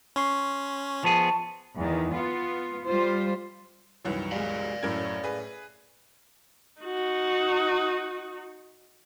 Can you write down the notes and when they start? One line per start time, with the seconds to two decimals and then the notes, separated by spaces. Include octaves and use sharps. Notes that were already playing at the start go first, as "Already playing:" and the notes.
0.16 C#4 C6 C#6 C7
1.04 F3 B3 G#4 A5
1.76 E2 D#3
2.10 B3 F4
2.86 G3 F4 C5
4.05 C2 F#2 D#3 E3 B4 C#5
4.32 G3 G#3 D5 F5
4.83 F#2 A2 A3 C#4 A#4 G#6
5.24 G#4 B4
6.82 D#4 F#4